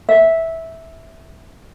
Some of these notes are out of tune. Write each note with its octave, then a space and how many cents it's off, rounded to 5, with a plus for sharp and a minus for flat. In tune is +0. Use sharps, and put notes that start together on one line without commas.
E5 -10